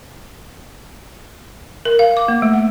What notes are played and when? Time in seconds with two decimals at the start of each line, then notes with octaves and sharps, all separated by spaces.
1.85 A#4
1.99 F5
2.17 D6
2.28 A#3
2.42 A3
2.53 F#5